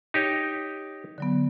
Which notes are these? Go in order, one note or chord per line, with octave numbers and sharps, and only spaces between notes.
D#4 G4 C#5
D3 F#3 B3